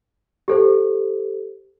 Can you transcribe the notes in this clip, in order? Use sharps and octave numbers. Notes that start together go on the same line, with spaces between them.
G4 A4 C5